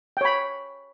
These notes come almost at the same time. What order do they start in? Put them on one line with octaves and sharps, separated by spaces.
G5 C#5 B5